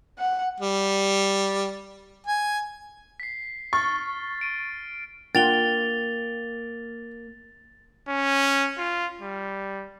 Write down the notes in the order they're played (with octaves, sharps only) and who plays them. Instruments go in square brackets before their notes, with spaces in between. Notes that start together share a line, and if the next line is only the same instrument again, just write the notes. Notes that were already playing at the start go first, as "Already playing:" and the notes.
[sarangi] F#5
[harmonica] G3
G#5
[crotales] B6 C7
[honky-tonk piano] C#6 [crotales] F6 A6
[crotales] D7 D#7
[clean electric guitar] A#3 [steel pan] D4 F4 F#5 [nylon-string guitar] G5 [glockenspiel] A6 F7 G7
[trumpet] C#4
F4
G3